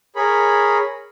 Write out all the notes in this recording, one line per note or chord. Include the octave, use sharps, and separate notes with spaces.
G#4 A#4 C#5 B5